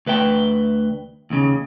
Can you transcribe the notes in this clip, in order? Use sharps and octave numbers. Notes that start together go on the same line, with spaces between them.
D2 B4 E5 G5
D#2 C#3